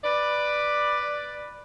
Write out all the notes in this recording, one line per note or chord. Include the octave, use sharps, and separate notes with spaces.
B4 D5